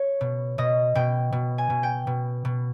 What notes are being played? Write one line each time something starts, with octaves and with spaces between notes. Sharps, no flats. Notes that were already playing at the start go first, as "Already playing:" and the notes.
Already playing: C#5
B2
B2 D#5
B2 G5
B2
G#5
B2
G5
B2
B2